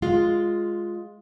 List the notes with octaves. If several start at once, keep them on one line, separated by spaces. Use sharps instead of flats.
G#3 F4